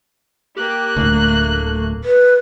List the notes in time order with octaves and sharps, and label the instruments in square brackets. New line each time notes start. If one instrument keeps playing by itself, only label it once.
[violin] A#3 F#6 [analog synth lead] G4
[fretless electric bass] D1 G1 D2 [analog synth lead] A3
[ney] B4